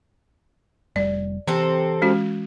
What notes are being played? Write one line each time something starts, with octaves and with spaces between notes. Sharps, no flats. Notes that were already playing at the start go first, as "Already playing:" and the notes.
F1 G3 D5
C3 E3 C4 A4 A#5
G#3 C#4 F#4